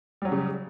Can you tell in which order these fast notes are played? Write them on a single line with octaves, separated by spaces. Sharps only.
G3 F#3 C#4 C#3